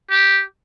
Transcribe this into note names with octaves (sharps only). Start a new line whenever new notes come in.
G4